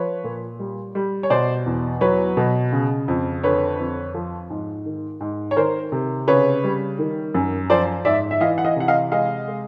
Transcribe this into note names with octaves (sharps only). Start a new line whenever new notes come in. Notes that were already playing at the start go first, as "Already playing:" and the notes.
Already playing: F3 B4 C#5
A#2
G3
G3
C#5
B2 C5 D5
E2
F#3 B4 C#5
B2
C#3
F2
D3 B4 C#5
F2
F3
G#2
D#3
G#2
C#5
D#3 A#4 C5
C3
C#3 B4 C#5
G3
D#3
F#2
F3 C5 D5
G#2 D5 E5
E5
E3 D#5 F5
F#5
D#5 F5
C3 F#5
D#5 F5
G#3 D#5 F5
G#3